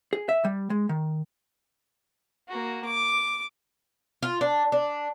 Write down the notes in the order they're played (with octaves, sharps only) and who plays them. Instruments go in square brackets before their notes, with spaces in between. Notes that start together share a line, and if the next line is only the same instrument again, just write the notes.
[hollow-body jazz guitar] G#4
E5
G3
G#3
D#3
[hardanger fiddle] A#3 F#4
D6
[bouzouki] F4
D4
D4